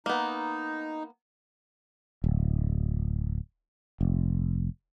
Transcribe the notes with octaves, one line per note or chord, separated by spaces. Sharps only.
A#3 B3 D#4
D1
F1